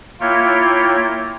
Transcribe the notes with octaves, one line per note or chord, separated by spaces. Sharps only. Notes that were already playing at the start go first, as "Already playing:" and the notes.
A#3 E4 F4 C#5 G5